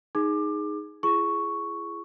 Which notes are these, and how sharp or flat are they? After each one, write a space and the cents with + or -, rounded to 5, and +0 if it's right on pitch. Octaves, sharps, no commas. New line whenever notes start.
D#4 +0 G#4 +0 D6 +20
E4 +40 G#4 +5 C#6 +0